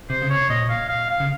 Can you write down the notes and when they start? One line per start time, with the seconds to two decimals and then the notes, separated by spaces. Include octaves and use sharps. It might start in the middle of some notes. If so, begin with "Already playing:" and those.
0.09 C3 C5
0.22 C#3
0.30 C#5
0.35 C3
0.50 A#2 D#5
0.69 F5
0.88 F5
1.09 F5
1.20 C#3